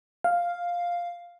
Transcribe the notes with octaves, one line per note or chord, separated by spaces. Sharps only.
F5